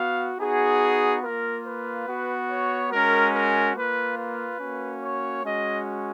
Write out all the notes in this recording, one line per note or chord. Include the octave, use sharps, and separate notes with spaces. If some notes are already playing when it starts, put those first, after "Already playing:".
Already playing: B3 F#4 F5
B3 D#4 F#4 G#4
A#3 F4 A#4
B4
B3 F#4
C#5
G#3 C#4 F#4 A#4
A#4
A#3 F4 B4
B4
A#3 C#4 F#4
C#5
G#3 C#4 F#4 D#5